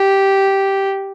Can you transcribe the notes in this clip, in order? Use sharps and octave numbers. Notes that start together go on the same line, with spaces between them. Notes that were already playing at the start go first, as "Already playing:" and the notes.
Already playing: G4